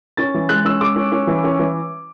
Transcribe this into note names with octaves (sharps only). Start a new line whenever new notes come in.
C#4 A6
E3
G#3 F#6
C#4 E6
G#3 D6
C#4
C#4
E3
C#4
E3